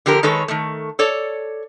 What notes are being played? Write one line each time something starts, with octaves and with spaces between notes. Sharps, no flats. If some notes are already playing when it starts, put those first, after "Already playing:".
D3 F3 G4 A#4
D#3 G#3 A4 B4 C#5
D#3 A3
A4 C#5 D5